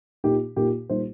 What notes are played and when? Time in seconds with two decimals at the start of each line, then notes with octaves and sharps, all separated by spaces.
0.24 A#2 A#3 D#4 G4
0.56 A#2 A#3 D#4 G4
0.90 A#2 G3 A#3 D#4 C5